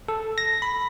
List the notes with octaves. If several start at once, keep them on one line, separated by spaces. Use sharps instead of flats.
A4
A#6
B5